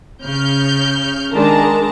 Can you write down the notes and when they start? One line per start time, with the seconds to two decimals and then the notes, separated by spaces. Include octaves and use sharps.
0.25 C#3 F6 G6
1.32 D#3 G#3 D4 A5 A#5